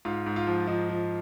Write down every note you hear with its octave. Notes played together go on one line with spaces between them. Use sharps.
G#2 F4
G#2
F4
F3
F3 D#4
F3